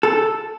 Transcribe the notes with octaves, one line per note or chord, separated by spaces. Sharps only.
A4